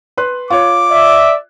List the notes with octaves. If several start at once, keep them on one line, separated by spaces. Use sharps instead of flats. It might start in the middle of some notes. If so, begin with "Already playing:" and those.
B4 C6 F#6
F4 C#5 D6
D5 E5